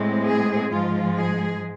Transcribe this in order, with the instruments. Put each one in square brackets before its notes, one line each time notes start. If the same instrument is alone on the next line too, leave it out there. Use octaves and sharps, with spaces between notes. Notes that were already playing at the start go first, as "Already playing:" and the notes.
Already playing: [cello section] A2 G#3 C4
G#4
G#2 F3 G#3 F4
G#4